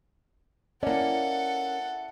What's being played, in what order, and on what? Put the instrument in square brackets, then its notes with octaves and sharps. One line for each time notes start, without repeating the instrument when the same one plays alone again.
[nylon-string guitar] A#3 C#4 [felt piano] E4 D5 [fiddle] A4 F#5